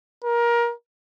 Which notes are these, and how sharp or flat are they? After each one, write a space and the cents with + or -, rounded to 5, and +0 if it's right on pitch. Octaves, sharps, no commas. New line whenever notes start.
A#4 +20